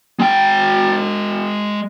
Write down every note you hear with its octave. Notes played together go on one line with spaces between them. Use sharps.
G#3 G5